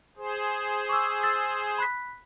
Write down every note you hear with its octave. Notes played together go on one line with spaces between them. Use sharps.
G#4 C5
C#6 D6 E6
E6 A6 C7
B5 F#6 B6